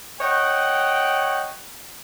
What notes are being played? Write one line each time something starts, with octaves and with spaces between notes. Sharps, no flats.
C#5 D#5 F#5 G5